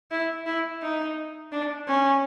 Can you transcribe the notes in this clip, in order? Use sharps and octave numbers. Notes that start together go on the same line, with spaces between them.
E4
E4
D#4
D4
C#4